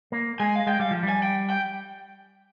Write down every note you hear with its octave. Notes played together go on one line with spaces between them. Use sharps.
A#3
G#3 G#5
F5
G#3 G5
G3 F5
F3
G3
G#5
G5
G5